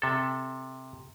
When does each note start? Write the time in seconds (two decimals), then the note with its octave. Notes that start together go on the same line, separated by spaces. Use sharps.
0.02 C3 A4